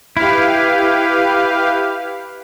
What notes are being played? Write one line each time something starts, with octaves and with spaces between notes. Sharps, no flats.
E4 G4 B4 F5